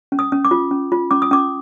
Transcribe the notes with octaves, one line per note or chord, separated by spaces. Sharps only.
C#4
D#6
C#4
D6
F4
C#4
F4
C#4 D6
D#6
C#4 D6